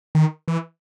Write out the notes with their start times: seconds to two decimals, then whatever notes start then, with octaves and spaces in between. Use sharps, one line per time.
0.15 D#3
0.48 E3